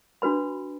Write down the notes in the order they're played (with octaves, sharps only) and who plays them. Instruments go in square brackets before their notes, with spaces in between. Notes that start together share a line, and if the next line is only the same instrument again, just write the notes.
[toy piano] D4 F#4 B4 B5